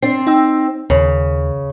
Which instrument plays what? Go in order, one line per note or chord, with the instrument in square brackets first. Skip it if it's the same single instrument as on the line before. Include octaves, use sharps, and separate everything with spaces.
[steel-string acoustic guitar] C4 [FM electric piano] D4 C7
[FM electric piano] D#4 G5 E6
[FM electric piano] D#2 [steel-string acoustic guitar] C#3